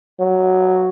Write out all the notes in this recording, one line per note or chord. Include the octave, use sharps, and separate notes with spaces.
F#3